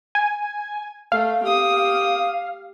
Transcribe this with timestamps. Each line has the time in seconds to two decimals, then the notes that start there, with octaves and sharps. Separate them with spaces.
0.15 G#5
1.12 A3 F5
1.43 G4 D#6